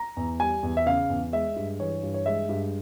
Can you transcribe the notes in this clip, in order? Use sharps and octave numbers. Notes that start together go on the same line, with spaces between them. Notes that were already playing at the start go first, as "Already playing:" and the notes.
Already playing: A#5
E2
G3 G#5
E2
E5
C#3 F5
E2
G#3 E5
G2
E3 C#5
G2
C#5
G#3 E5
G2